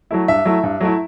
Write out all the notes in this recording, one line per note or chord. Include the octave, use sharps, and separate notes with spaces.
F#3 A3 E4
G2 E5
F#3 A3 E4
G2
F#3 A3 E4